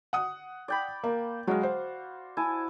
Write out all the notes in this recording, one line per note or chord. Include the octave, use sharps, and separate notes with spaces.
F#5 D#6
D5 G5 B5
A#3
F#3 G#3 F#4 F5
C5
E4 G#5 A5